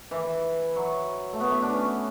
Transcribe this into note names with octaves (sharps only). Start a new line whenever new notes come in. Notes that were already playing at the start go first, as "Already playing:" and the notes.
E3
F#3
A3
B3
E4
D4
C#4